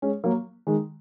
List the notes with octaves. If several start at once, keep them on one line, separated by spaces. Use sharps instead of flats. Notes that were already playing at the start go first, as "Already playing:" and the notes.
G#3 C#4
F#3 A#3
D#3 G#3